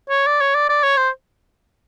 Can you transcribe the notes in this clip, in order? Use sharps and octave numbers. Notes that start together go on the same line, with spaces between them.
C#5
D5
C#5
D5
D5
C#5
C5